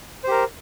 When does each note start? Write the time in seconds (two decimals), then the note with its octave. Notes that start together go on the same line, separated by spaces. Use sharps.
0.24 C5
0.28 G4
0.31 A#4